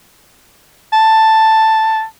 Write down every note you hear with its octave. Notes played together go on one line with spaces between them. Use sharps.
A5